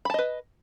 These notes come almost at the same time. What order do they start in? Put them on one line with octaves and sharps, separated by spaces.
B5 A5 D#5 B4